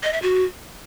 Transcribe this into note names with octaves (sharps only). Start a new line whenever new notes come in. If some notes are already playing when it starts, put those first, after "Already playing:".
D#5
E5
F#4